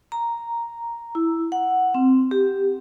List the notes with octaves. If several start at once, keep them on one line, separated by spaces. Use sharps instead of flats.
A#5
E4
F#5
C4
G4